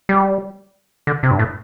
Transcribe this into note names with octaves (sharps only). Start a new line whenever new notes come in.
G3
D3
C3
G2
A2